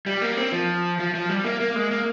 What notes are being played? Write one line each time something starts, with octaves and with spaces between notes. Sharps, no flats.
G3
A#3
C4
F3
F3
F3
G3
A#3
A#3
G#3
A#3